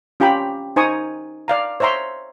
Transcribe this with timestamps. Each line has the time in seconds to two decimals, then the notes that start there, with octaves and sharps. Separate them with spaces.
0.20 C#4 F4 G4 G5 A#5 B5
0.76 D#4 C5 G#5 A#5 C#6 D#6
1.48 D5 F5 A#5
1.80 C5 C#5 E5 A#5 C6